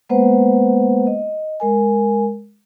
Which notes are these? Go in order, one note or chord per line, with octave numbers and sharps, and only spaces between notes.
G#3 A#3 B3 B4 C5 F#5
D#5
G#3 A#4 G#5